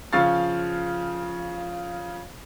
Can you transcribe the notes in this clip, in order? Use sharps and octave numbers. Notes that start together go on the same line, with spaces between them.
C#3 F3 F5 C#6 F6 A6